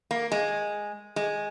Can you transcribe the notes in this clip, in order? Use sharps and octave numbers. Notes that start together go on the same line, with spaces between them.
A#3
G#3
G#3